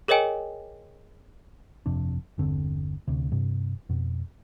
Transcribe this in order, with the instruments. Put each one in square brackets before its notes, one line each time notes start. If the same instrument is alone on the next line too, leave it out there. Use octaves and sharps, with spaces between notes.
[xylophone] G#4 A#4 C#5 D#5 G5 G#5
[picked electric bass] G1 F2 C3 D4
G1 E2 D3 C4
D2 C3
G2 C3
F2 B2